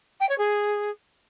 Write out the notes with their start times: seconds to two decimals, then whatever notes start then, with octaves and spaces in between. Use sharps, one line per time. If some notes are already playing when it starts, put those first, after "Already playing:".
0.20 G5
0.29 C#5
0.38 G#4